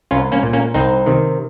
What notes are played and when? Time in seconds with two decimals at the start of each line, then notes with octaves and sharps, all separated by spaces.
0.11 C2 C#4 F4
0.32 A#3 C#4
0.43 A#2
0.53 A#3 C#4
0.74 C2 C4 D#4
1.06 C3 D#3